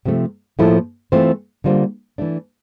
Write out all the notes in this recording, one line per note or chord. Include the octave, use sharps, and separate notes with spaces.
C3 F3 A3
A2 F3 A#3 E4 A4
E3 A3 C4 F4 C5
D3 G3 A#3 F4 C5
E3 A3 D4